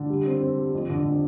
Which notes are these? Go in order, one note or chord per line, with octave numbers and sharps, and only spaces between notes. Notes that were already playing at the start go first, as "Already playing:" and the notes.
Already playing: D3
G3
C4
C4
G3
F2
D3
D3